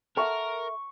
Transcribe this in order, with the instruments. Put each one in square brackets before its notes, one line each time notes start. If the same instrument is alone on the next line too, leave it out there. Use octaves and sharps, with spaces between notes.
[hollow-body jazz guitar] A4 E5 F#5 [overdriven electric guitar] A#4 [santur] C#6